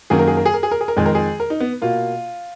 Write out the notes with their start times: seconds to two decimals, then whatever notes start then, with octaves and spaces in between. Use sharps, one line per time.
0.10 F#2 D#3 F#3 A#3 G#4
0.19 A#4
0.28 G#4
0.37 A#4
0.46 G#4
0.54 A#4
0.63 G#4
0.71 A#4
0.81 G#4
0.88 A#4
0.96 F2 D#3 G#3 G#4
1.06 A#4
1.15 G#4
1.40 A#4
1.50 D#4
1.60 B3
1.82 B2 A#3 F4